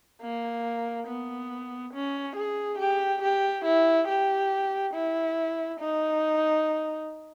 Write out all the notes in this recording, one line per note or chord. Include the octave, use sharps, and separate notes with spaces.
A#3
B3
C#4
G#4
G4
G4
E4
G4
E4
D#4